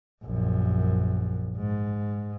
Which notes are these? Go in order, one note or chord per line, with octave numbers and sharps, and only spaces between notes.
A#1 F#2
G#2